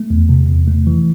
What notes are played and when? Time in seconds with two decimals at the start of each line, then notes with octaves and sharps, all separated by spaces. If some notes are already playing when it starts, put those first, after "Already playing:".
Already playing: A3
0.10 E2
0.29 C3
0.49 E2
0.68 A3
0.87 E3